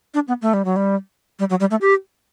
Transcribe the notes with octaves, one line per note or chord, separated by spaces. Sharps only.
D4
B3
A3
G3
F#3
G3
G3
F#3
G3
A3
G4